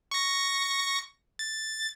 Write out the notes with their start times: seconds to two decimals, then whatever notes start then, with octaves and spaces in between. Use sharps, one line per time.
0.11 C#6 A#6
1.39 A6